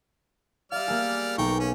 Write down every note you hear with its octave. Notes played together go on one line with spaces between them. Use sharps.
G3 D5 F5 E6 F6
A#3 G#4
B1 G5 G#5 A#5 C#6
C#4